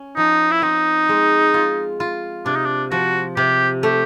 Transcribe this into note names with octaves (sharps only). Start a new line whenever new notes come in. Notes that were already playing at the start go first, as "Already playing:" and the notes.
Already playing: C#4
F3 D#4
E4
C4 D#4
G#3
F4
F4
C3 D4
D#4
D4
F3 F#4
C3 G4
A3 G4